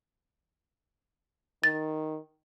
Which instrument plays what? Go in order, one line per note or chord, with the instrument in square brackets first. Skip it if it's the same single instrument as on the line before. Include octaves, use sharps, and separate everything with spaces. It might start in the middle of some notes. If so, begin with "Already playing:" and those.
[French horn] D#3 [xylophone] A6